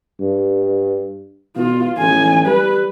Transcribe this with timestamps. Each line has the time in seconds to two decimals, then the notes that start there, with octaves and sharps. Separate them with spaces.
0.21 G2
1.56 B2 F4
1.99 A1 G#5
2.46 G3 B4